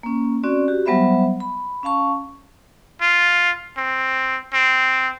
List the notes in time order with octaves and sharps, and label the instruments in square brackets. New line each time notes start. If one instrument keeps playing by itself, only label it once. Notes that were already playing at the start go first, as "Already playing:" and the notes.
[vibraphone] A#3 C#4
C4 C#4 F#4 D5
F#4 G4
F#3 G3 B3 C5 E5 B5
B5
C#4 F5 A5 C#6
[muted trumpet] F4
C4
C4